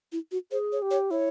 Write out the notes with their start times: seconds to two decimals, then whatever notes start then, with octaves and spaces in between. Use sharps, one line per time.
0.12 E4
0.32 F#4
0.51 G#4 C5
0.72 C#5
0.82 G4
0.91 C#5
1.11 E4 C#5